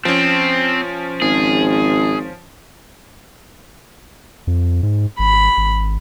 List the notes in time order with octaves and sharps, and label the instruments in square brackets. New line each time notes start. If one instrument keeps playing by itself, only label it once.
[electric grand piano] F3 C#4 [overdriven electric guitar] C4
[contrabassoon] G#1 [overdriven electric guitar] G#4
[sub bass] F2
G#2
[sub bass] G#1 [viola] B5
[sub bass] G#1